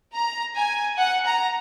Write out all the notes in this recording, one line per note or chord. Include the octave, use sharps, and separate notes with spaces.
A#5
G#5
F#5
A#5